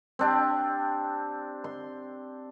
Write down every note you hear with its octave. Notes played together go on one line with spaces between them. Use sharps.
C4 D4 G4
C6